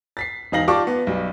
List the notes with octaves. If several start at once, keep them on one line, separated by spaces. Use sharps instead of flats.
A6 B6 C7
E1 D#4 F5 A#6 F#7
F4 G4 D5 A5 C#6 D6
B3
B1 G3